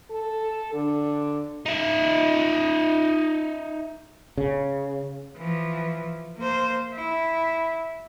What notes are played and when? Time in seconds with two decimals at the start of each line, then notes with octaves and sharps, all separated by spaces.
0.11 A4
0.74 D3
1.66 D#4 E5
4.37 C#3
5.37 E3 F3
6.38 A#3 C5
6.93 E4